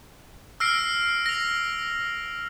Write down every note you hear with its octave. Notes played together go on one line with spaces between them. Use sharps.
E6 F6 A#6 C7 D7
A#6 F7